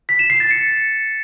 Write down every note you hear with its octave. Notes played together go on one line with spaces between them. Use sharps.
B6
E7
C7
A6
C#7